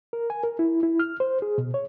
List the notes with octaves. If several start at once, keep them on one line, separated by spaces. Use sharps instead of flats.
A#4
G#5
A#4
E4
E4
F6
C5
G#4
B2
C#5